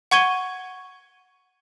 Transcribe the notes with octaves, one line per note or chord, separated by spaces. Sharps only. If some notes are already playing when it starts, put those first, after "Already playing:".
F#5 C#6 G#6 D#7 G7